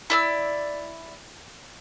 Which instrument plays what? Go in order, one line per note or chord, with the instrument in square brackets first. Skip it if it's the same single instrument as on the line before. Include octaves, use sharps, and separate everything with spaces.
[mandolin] E4 D5 E6